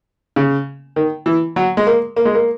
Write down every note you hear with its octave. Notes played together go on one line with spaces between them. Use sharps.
C#3
D#3
E3
F#3
G#3
A#3
A#3
G#3
A#3